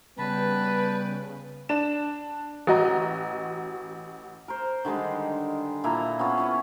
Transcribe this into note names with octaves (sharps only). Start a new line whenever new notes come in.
C#3 G3 B3 B4 G5 A5 B5
D4 E7
A1 F#4 D#5 A#5
A#4 C5
D3 D#3 G3 G#3
A#2 E4 A4 A#5
B3 C#4 F4
C#4 E4